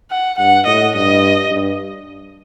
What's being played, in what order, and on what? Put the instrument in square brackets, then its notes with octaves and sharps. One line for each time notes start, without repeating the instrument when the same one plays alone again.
[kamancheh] F#5
[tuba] G2 [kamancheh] F#5
[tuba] A2 [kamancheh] D#5
[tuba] G2 [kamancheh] D#5
[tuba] G2